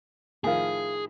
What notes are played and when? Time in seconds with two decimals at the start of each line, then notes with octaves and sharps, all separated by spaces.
0.44 A2 D#3 F3 G#4 F5 G#5